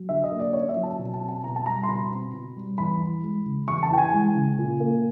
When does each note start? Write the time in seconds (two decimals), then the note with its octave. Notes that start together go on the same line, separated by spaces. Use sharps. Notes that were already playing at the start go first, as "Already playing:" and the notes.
Already playing: F#3
0.09 D3 E5
0.24 D#5
0.31 A#3
0.39 D5
0.53 C#4 C#5
0.69 E5
0.76 F#3
0.83 A5
0.99 B2
1.14 A5
1.20 C4
1.29 A5
1.43 B2 A#5
1.56 A5
1.66 G3 A#5
1.83 C6
1.88 B2 B5
2.11 C4
2.33 B2
2.56 G3
2.78 E2 B5
3.01 E3
3.23 G#3
3.46 C#3
3.68 E2 C#6
3.83 A5
3.91 E3 G5
3.98 G#5
4.12 G#3
4.35 C#3
4.58 A#2
4.80 A#3